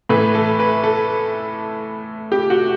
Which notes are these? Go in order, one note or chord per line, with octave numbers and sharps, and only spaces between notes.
A2 E3 A3 B4
A4
B4
A4
G4
F#4